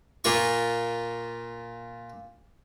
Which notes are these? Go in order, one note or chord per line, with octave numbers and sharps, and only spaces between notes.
A#2 A#3 F4 C#6